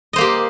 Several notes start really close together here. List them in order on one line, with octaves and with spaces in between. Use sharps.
D#5 C5 A#3 G4